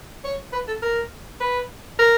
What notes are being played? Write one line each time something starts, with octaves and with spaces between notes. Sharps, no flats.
C#5
B4
A4
A#4
B4
A#4